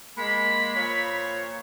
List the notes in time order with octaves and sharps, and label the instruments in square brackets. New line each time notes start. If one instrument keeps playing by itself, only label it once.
[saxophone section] G#3 A#3 [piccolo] B5
[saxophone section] A#2 F3 C#5